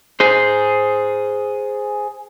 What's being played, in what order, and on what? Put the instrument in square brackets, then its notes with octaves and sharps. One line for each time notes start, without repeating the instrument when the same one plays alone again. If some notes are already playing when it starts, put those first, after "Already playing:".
[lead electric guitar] G#4 C5